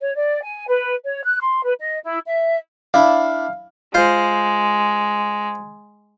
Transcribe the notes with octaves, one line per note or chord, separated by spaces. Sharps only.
C#5
D5
G#5
B4
C#5
F#6
C6
B4
D#5
E4
E5
D4 E4 D5 F5
G#3 F4 C5